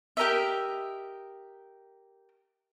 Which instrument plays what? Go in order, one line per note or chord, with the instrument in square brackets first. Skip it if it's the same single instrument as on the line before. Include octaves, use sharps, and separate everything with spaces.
[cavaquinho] G4 A#4 D#5 E5